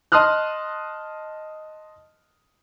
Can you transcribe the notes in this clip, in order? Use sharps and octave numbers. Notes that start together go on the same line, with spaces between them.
D#5 A5 C6 D#6 F6 F#6